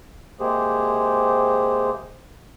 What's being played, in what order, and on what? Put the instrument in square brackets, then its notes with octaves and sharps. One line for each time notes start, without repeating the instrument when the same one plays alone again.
[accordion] C3 G#3 A#3 G4 G#4 C5